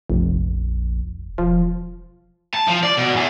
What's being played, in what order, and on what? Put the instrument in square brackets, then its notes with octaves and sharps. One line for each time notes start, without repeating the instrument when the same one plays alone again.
[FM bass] F1 [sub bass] A#1
[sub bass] E1 [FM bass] F3
[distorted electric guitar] A5
F3
D5
B2
E2